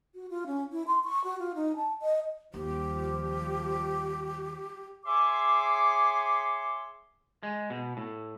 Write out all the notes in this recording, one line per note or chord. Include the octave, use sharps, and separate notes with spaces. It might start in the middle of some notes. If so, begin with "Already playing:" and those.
F#4
F4
C#4
E4
C6
C#6
F#4
F4
D#4
A5
D#5
D#2 F3 G3 G4
G#4 C#5 E5 G#5 C6 D6
G#3
B2
A2